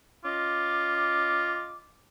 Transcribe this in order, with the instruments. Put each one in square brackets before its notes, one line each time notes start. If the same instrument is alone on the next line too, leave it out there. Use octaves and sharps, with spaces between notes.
[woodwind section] C#4 D#5 D6 [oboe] F4